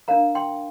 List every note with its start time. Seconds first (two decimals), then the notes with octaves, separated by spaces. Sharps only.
0.08 D4 A#4 F5 A#5
0.35 G5 C6